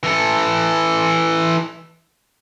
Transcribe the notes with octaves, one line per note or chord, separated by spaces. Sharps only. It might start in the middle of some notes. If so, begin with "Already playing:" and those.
E3 A4